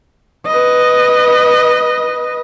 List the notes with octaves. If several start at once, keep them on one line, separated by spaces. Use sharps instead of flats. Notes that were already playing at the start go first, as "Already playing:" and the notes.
B4 D#5